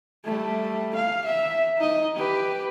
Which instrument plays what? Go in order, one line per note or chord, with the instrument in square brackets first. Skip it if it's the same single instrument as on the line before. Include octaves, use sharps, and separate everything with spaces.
[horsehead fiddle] G3 A3
F5
E5
D#4 D#5
G4 B4